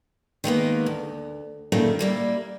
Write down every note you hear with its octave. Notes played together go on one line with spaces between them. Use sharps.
D#3 G#3 A#3 B3
D2
F#2 A#2 D#3 G3 A3
G3 A#3 E4